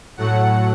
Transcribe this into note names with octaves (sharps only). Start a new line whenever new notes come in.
A2 F#3 A3 F#5